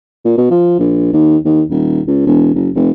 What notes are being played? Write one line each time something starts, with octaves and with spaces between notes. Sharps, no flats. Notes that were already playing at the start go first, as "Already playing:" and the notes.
A#2
B2
F3
A#1
D#2
D#2
D#1
C#2
E1
F#1
F1